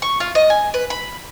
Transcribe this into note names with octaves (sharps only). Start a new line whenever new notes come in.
C#6
F4
D#5
G#5
B4
B5